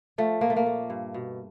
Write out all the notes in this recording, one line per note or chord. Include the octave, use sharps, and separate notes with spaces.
F3 A3
A#2 A#3
A3
A#3
A3
G2
B2